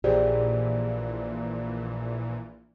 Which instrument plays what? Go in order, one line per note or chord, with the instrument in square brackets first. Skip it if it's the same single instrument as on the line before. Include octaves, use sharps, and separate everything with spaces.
[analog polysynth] A#1 A#2 E3 [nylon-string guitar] G4 G#4 [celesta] C5 D5